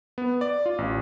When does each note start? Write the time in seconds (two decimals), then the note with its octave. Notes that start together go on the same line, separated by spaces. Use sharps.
0.18 B3
0.41 D5
0.66 F4
0.78 A1